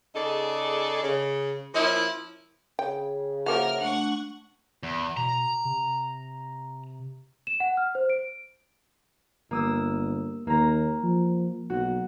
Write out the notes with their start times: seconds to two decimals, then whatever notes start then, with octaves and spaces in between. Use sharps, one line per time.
0.15 C#3 D#4 G#4 A4 D5
1.03 C#3
1.75 F3 A#3 C#4 E4
2.79 C#3 G5
3.46 F3 A#3 F#4 A#4 E5 F#5 F6
3.80 A3 D4 F#5 C#6
4.83 E2
5.17 B2 A#5
5.65 C3
7.47 E7
7.60 F#5
7.77 F6
7.95 C5
8.10 D7
9.51 G1 A#3 D#6 E6
10.47 D#2 A#3 A#5
11.04 F3
11.70 B1 F#4